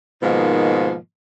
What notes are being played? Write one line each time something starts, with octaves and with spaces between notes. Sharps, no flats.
G#2 B2 D#3 F3 A#3